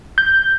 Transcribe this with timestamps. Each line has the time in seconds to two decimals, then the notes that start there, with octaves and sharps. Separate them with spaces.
0.18 G6